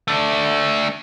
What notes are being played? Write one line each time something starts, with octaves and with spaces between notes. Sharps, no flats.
A3 D4